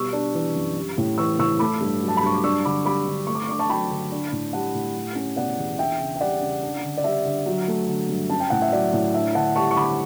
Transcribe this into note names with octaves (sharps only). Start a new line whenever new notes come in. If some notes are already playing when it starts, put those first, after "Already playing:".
Already playing: B2 G3 C#6 E6
D4
E3
F#2
G3
A2
E3 C#6 E6
A2 C#6 E6
A3 B5 D6
G2
F#3
A5
B5
G2 C#6
D6
D4 C#6 E6
D3 B5 D6
G3 B5 D6
D3
A3 C#6
D6
C#6
D4 D6
A5 C#6
F#3 G5 B5
D3
D4
A2
G3 F#5 A5
A2
G3
C#4
B2 D5 F#5
E2
D4 E5 G5
C#3
G5
G3 D5 F#5
C#3
D4
D3
D5
G3 E5
D3
F#3
A3
D3
G2
C#4 A5
G5
A2 F#5
E5
F#3 D5
A2
D4 E5
D3 F#5 A5
G3 A5 C#6
C#6
D3 B5 D6